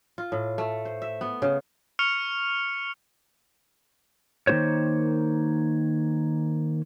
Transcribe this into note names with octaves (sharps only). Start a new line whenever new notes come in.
F4
A2
A3
C5
E5
B3
C#3
C#6 F6 C#7 F7
D#3 A#3 B3 F#4 C5 C#5